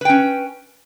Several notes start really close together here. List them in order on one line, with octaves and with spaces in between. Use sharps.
B4 G5 C#4